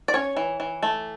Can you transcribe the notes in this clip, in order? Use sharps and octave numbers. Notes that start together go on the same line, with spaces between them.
D5
C#4 C#5
E3
E3
A3